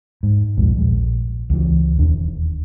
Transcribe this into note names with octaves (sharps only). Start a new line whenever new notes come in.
G#2
A#1 D#2 G#3
A#1 G#3
C#2 E3
E1 D#2 D4